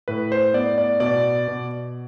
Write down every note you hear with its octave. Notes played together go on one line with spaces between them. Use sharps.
A2 B4
C5
B3 D5
D5
B2 D5
B2